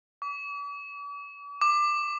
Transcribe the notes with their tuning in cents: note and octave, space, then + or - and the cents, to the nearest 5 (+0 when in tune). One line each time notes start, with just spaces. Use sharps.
D6 -45
D6 +20